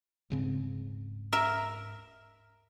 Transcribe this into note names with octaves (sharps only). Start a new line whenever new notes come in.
D#1 G#2 C#3 C4
A#4 E5